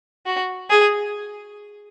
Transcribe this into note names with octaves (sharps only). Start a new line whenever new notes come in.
F#4
G#4